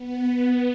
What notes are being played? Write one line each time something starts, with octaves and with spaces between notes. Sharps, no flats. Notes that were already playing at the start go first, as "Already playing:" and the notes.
Already playing: B3